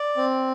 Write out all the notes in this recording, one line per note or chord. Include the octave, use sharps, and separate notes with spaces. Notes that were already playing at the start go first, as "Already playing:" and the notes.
Already playing: D5
C4